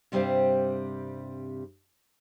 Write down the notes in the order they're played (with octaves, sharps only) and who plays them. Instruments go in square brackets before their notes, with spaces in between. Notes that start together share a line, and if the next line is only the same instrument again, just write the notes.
[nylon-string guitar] G2 C3 G3 C4 C5 F5